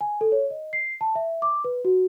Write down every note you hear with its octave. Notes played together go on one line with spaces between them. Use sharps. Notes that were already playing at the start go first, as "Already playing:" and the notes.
G#5
A4
C#5
D#5
C7
A5
E5
D6
B4
F#4